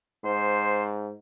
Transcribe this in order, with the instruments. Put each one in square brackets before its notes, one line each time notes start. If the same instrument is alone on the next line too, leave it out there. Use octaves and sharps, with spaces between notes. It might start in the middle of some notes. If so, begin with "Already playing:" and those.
[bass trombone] G#2 [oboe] C5